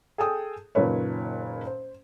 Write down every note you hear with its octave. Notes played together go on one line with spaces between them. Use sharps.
G#4 A4 G5 D#6
F#1 A#2 D#3 B4 C#5
C5